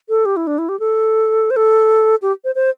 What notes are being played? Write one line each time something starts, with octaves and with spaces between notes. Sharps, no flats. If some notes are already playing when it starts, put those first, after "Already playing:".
A4
G4
E4
D4
E4
G4
A4
C5
A4
G4
C5
C5